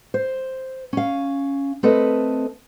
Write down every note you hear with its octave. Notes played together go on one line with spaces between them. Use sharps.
C5
C#4 F5
A3 C4 A4 B4 D#5